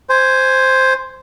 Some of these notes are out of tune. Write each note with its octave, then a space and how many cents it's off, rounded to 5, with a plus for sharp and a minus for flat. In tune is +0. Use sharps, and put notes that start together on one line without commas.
C5 +0 G#5 +0